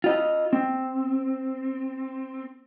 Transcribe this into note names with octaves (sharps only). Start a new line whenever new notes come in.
F4 D#5
C4